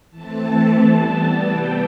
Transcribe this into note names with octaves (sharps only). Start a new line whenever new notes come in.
E3 A3 C4 A5
E3 G3 B3
C3 E3 G3 B3 G5